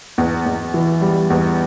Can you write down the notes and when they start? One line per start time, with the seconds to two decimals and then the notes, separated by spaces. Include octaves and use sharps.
0.18 E2
0.46 E2
0.74 E3
1.01 G3
1.30 E2